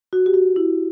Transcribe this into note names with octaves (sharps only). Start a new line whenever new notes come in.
F#4
G4
F#4
E4